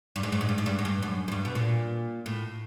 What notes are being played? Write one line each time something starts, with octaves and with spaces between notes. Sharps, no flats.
G2
G#2
G2
G#2
G2
G#2
G2
F#2
G2
F#2
F#2
G2
B2
A#2
A2